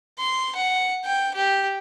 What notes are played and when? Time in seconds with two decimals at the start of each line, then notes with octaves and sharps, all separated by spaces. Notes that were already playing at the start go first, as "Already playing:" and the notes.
0.19 C6
0.56 F#5
1.05 G5
1.35 G4